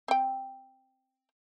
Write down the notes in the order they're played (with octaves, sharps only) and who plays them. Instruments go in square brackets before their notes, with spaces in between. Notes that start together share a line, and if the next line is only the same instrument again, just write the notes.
[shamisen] C4 G5